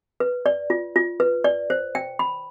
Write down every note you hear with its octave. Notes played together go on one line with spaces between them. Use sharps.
B4
D5
F4
F4
B4
D5
C5
G5
B5